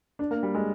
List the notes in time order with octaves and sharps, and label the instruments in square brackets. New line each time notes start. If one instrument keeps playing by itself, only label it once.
[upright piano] D4
A#3
G3
G#3